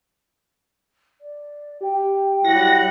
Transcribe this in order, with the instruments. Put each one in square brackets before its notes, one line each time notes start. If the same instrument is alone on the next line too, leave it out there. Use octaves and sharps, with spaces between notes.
[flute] D5
[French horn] G4 [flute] G5
[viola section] F#3 G3 F#5 [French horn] E4 [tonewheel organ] A#6